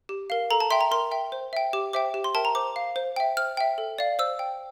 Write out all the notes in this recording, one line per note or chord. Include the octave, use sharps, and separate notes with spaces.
G4
A#4 F5
A4 A#5
A5
E5 G5 C6
A#5
A#4 C6
E5 G5
C5
E5 G5
G4 D6
C5 E5 G5 D6
G4
C6
A#4 E5 G5 A5
A#5
C5 D6
F5
C5
E5 G5
C5 F6
E5 G5
A4
D5 F5
C5 E6
G5